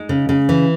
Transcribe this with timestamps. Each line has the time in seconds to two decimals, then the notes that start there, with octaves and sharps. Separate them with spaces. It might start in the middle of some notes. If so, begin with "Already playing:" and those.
Already playing: G#3 D#4
0.09 C#3
0.29 C#3
0.49 E3